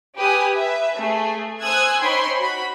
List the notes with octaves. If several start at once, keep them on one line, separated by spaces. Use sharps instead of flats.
G4 B4 G#5 D#6
B4 E5
A3 G#4
C5 G#5 D#6 E6 F#6 G#6
D#4 C5 C#5 G5 B5 C6
F#4 B5